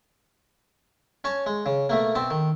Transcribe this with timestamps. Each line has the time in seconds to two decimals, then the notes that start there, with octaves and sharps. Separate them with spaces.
1.24 C#4 C#5 A5
1.46 G#3
1.66 C#3
1.89 B2 A3 A#3
2.15 B2 C4 A5
2.31 D#3